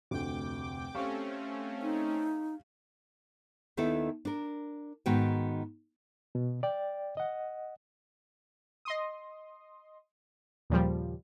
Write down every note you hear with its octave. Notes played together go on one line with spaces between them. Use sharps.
F1 D2 G5 D6
A3 C4 C#4 G4 F5 C#6
D#4
D#2 D#3 B3 E4 A4
D4 A#4
G#2 D#3 B3 F#4 G5
B2
D5 G5
D#5 F#5
D#5 C6 D#6
D#2 A#2 C#3 F3 G3